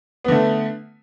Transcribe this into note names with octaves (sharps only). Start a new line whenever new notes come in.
D3 A3 B3